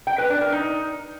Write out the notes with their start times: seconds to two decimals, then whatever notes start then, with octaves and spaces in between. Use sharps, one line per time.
0.07 G5
0.18 B4
0.30 D4
0.41 A#4
0.52 D#4